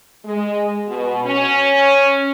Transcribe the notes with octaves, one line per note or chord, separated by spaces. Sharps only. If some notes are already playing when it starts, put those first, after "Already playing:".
G#3
B2
C#4